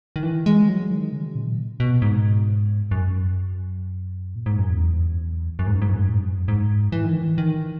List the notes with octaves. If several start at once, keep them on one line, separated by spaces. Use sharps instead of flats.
D#3
E3
G#3
F#3
D#3
C#3
A#2
B2
G#2
F#2
A#2
G#2
F#2
E2
F#2
G#2
F#2
G#2
F#2
G#2
F#2
G#2
F#2
G#2
E3
D#3
E3
D#3